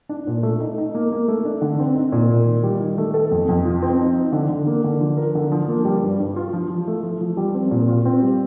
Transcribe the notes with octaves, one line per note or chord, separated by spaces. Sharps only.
D4
A#2
A3
D#4
D#4
A#3
A#3
A3
D4
D3
C4
D#4
A#2
A#3
D#3
G3
D#3
A3
A4
F2
F2
F3
C4
D#4
D#4
D3
D3
A#3
D3
F3
A#4
D3
F3
A#3
G3
G2
G2
F4
F3
F3
A3
F3
F3
G3
C4
A#2
F4
C4
G3